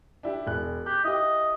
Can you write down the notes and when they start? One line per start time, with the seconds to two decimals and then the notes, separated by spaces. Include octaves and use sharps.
0.23 D4 E4 G4
0.47 E1 F#6
0.86 G4 F#6
1.04 E4 G4 D#5